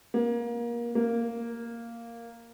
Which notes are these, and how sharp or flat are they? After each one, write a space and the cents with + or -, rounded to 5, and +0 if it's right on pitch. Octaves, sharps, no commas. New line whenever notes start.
A#3 +25
A#3 -5